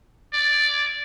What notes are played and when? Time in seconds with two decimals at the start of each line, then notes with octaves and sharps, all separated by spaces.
0.33 D5